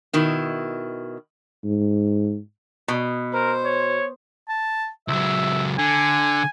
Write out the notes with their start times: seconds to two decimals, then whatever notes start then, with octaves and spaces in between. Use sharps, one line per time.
0.13 B2 D#3 E4
1.64 G#2
2.88 B2
3.34 A#4 C5
3.65 C#5
4.49 A5
5.08 C#2 F#3 E5
5.78 D3 G#5